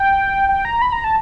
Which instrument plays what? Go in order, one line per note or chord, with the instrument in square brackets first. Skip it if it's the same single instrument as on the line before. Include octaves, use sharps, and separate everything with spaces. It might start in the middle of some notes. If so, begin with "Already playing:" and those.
Already playing: [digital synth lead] G5
G5
A#5
B5
A#5
A5